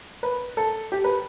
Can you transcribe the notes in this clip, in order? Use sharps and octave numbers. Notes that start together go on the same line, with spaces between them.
B4
A4
G4
B4